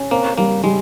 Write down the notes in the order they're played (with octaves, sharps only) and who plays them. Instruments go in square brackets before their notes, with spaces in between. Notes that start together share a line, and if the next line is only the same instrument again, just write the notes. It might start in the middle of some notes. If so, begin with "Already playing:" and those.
Already playing: [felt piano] C#4
[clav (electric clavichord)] A#3 [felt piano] C4
[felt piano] G3 [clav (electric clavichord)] A#3
[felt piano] G3 [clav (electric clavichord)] G#3